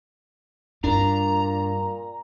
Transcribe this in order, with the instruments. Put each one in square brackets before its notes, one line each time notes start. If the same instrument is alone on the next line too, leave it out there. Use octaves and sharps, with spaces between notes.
[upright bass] G2 [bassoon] A#2 [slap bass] D4 [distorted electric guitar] A#5